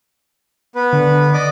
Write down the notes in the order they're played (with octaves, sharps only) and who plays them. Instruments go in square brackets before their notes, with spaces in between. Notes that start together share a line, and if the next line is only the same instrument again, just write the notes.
[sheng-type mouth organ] B3 B4
[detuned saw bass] D3
[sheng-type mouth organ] D5 D#5 D6